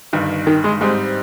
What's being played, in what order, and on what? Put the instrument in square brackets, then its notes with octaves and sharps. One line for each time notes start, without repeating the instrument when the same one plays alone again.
[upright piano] G1 G2 D#3
[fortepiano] D#3
G#3
[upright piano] G#2 G3 C4 D#4 [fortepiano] G#3